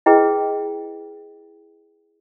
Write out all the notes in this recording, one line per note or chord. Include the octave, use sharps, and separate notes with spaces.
E4 G#4 B4 D#5 G5